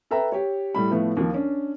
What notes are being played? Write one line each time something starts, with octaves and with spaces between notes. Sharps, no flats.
A4 B4 E5 G5 A#5
G4 C#5
A2 G3 B5
A2 F3 A3 B3
D#2 F3
C#4 D4